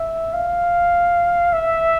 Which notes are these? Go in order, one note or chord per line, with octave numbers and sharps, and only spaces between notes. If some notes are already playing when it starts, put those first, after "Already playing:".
Already playing: E5
F5
E5